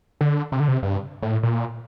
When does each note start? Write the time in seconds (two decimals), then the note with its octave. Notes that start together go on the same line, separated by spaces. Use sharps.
0.21 D3
0.52 C3
0.60 D3
0.68 C3
0.83 G2
1.22 A2
1.43 A#2